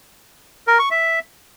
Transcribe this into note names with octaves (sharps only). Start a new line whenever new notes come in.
A#4
C#6
E5